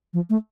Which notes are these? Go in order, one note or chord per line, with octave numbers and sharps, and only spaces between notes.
F3
A3